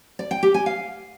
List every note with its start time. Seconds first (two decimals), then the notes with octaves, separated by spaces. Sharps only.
0.19 D5
0.31 G5
0.43 G4
0.54 G#5
0.66 F5